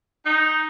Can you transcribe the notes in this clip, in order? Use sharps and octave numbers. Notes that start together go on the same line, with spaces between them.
D#4